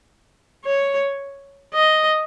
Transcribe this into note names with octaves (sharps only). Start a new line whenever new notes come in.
C#5
D#5